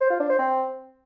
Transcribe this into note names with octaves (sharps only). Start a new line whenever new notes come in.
C5
F4
D4
C5
C4